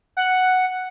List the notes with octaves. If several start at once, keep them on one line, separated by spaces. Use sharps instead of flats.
F#5